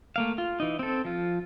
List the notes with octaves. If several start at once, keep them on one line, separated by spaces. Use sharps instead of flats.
A3 A#3 F5
F4
E3 D#4
C4 A4
F3 F4